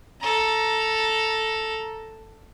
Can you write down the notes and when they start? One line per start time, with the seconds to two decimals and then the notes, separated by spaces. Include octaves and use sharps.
0.21 A4 A#5